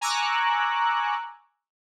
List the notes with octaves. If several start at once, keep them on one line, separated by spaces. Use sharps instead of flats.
G#5 A#5 C#6 D6 E6 F#6